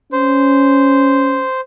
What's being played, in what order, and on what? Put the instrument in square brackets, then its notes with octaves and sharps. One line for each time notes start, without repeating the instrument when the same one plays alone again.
[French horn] C#4 [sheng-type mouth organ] C5